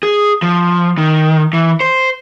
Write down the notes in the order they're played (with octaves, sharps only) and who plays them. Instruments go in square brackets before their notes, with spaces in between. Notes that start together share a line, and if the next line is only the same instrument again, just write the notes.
[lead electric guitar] G#4
F3
D#3
E3
C5